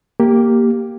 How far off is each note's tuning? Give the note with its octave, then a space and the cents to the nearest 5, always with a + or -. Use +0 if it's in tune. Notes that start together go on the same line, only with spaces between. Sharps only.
A#3 +0 G4 +0